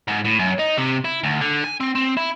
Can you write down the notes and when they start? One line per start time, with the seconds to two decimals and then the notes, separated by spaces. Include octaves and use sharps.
0.08 G#2
0.25 A2
0.39 F#2
0.59 D#4
0.78 C3
1.04 E4
1.23 D2
1.41 D3
1.64 G#5
1.80 C4
1.95 C4
2.17 E4